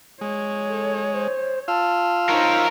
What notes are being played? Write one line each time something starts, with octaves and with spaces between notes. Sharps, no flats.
G#3 C#5
A4
C5
F4 F5 A5 E6
D#4 A#4 C5 C#5